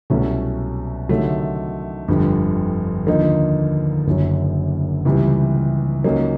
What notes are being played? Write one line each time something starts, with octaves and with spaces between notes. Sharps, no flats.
C2 B2 F#3 A3 C#4
D2 C3 D#3 F#3 A3
G1 F2 D3 G3
D#2 D3 F3 A#3 D#4
F#1 F#2 D3 F#3
C#2 C3 E3 G3
C#2 C#3 F#3 A#3 D#4